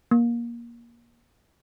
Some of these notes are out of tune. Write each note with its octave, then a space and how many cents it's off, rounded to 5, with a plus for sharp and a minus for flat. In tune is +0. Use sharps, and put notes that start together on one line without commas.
A#3 +20